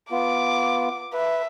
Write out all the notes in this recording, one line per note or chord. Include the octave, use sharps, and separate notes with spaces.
B3 F4 D6
B4 E5